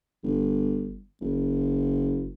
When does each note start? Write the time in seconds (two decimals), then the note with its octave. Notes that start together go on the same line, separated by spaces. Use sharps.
0.23 G1
1.21 F#1